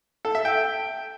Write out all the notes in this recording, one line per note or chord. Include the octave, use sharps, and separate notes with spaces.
A4
E5
G5